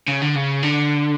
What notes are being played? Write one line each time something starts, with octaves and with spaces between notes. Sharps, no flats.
C#3
D3
C#3
D3